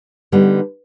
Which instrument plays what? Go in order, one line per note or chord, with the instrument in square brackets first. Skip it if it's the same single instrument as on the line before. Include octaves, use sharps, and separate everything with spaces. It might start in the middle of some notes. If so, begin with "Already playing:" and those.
[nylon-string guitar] D3 G3 B3 D#4